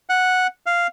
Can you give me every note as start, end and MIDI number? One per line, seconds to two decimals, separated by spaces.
0.09 0.47 78
0.66 0.87 77